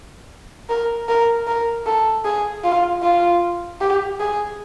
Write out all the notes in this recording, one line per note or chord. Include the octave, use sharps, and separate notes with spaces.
A#4
A#4
A#4
A4
G#4
F4
F4
G4
G#4